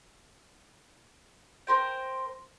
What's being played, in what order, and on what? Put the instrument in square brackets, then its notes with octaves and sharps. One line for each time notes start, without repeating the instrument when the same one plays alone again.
[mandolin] A#4 C5 G5